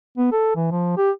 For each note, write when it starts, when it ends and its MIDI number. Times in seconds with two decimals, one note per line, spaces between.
0.18 0.29 59
0.32 0.53 69
0.56 0.68 52
0.71 0.92 53
0.97 1.11 67